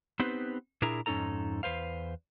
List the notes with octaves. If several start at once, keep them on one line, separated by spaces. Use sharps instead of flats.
B3 C4 D#4 G4 B4 C5
A#2 D4 E4 G#4 A#4 A#5
F2 G#2 C#4 D#4 A4 A#5
E2 B4 C5 F5